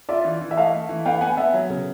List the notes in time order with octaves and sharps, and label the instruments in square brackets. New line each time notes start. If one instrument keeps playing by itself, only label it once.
[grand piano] F4 [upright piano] D5 E5
[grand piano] E3
E3
[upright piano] E5
[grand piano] A3 [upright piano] D#5 F5
[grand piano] A3
E3
[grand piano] B3 [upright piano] F5 G5
[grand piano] B3 [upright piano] F#5 G#5
[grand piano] B3 [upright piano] E5 F#5
[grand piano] F#3
C#3